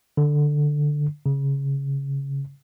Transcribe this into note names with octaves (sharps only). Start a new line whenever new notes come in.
D3
C#3